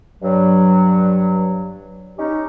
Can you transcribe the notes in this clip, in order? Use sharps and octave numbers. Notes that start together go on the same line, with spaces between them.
G2 F#3
C#4 D#4 G4